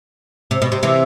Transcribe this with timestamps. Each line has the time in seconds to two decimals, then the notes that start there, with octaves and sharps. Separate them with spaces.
0.51 C3
0.62 B2
0.72 C3
0.83 C3 E3